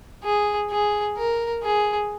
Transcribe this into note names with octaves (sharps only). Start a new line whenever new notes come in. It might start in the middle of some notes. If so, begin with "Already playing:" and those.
G#4
G#4
A#4
G#4